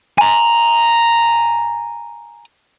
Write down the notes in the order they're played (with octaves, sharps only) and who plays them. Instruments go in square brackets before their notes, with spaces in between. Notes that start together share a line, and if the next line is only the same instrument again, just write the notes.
[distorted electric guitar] G#5 A#5